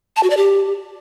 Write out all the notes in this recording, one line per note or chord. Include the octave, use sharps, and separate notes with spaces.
A5
F#4
D5
G4